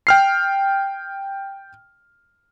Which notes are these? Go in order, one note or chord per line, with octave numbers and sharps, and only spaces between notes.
G5 F6 C7